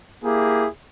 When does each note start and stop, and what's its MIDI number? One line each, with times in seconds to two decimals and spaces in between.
0.23 0.67 58
0.23 0.67 64
0.23 0.67 67
0.23 0.67 68